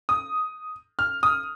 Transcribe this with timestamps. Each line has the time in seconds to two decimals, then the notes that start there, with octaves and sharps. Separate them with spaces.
0.09 D#6
0.99 F6
1.23 D#6